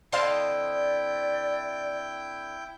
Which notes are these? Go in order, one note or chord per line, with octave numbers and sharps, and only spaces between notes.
D3 C4 E4 D#5 F5 G5 A5 C6
D5